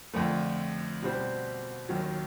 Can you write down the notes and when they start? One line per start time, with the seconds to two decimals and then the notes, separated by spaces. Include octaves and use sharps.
0.14 F2 D3 F3 A3
1.02 B2 G3 C4
1.89 D#2 D#3 F#3